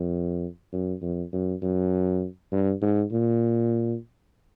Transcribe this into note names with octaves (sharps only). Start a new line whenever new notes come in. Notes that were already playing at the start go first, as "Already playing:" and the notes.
Already playing: F2
F#2
F2
F#2
F#2
G2
G#2
A#2